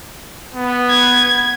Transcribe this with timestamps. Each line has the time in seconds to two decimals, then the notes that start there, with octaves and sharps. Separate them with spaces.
0.54 B3
0.89 G#6